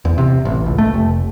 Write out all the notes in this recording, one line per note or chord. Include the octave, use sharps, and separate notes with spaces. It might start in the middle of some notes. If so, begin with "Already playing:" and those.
E2
C3
A1
C#2
A3
F1